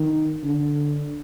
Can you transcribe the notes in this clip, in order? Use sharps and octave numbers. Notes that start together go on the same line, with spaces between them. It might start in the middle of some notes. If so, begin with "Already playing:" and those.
Already playing: D#3
D3